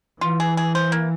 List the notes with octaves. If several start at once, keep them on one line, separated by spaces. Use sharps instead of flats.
E3 F4
G#4
G#4
C5
A#3